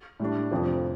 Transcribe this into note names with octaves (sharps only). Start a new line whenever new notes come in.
A2 G3 D4
F1 F2 F3